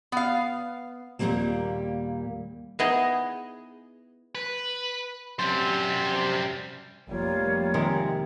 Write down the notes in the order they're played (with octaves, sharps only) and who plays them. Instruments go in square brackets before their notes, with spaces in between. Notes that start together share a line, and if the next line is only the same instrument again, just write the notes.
[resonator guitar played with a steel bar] B3 F5
[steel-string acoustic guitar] D#2 A#2 E3 G3 G#3 A#3
[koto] B3 D#4 E4 G#4 D#5
[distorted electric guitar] B4
[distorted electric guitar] F#2 G3 [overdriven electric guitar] G4 C5
[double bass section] F1 G3 A#3 [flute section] F4 C#5
[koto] C3 D#3 G#3